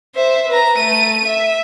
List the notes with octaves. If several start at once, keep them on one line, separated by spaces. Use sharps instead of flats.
C5 E5
B4 A#5
A3 D#7
E5